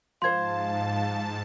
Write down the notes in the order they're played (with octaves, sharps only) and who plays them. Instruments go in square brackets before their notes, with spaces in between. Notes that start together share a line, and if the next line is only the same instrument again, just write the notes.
[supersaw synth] G#2 A5 [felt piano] F3 C5 [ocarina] F5 [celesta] C6 G#6